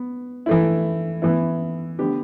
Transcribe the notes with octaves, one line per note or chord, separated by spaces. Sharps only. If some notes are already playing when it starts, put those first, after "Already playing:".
Already playing: B3
E3 A3 E4
E3 B3 E4
D3 B3 G4